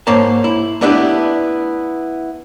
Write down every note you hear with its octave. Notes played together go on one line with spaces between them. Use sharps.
G#2 A#3 C5 C#5 A5
E4
A3 B3 D4 E4 G4 B4